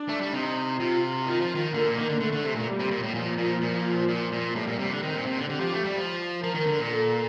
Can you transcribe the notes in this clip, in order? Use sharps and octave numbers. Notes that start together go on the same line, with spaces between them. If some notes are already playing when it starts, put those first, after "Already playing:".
Already playing: D4
A3
G3
C3 D#4
C3 F4
D#3 F4
F3
D#3
D3 A#3
A#2
D#3
D3
D3 A3
D3
C3
A#2
G3
C3
A#2
A2
A#2 F3
A#2
A#2
A#2
A#2
A2 G3
A#2
C3
D3
D#3 C4
A#2
C3
D3
D3 G4
F3
A3
G3
F3
F3 A#4
D#3
D3
A#2
A4